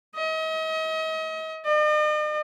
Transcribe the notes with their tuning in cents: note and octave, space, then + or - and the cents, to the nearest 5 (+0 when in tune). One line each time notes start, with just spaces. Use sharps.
D#5 +40
D#5 -45